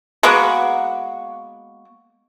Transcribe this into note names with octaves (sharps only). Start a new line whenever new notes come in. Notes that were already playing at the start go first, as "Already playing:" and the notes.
G#3 A#3 B3 F#4